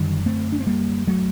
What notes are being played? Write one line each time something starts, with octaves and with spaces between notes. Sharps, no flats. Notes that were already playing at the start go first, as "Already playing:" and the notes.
Already playing: F#2 D3 D#3 G3
A3 C4
D4
C4
G3 A#3
F#3 A3